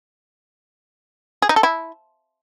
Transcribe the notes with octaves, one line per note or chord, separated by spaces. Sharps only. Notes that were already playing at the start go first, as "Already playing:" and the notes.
G#4
D#4
A4
E4